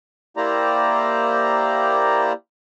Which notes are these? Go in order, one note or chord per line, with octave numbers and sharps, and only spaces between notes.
A#3 E4 G4 C5 D5 A#5